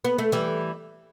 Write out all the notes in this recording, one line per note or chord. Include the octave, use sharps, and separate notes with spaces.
B3
A3
E3 G3